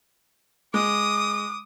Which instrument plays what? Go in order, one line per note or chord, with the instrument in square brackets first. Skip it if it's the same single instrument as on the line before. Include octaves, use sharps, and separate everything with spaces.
[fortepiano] G#3 [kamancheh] D6 D#6